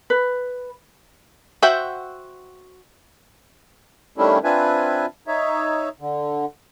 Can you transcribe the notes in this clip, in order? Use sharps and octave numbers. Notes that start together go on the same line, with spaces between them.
B4
F#4 C5 E5 F#5 G5
D#3 G3 A3 C#4 D4 E4
C4 D4 F4 B4 E5 G#5
D#4 C#5 E5
D3